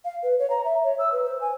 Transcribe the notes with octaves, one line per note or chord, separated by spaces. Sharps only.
F5
B4
C#5
A#5
E5
C#5
E6
B4
C5
G#5